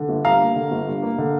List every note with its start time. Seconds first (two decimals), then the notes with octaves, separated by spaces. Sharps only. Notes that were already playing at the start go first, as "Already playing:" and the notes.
Already playing: D3
0.09 G1
0.25 G2 F5 A#5
0.41 A#3
0.56 D3
0.71 G1
0.87 G2
1.02 A#3
1.18 D3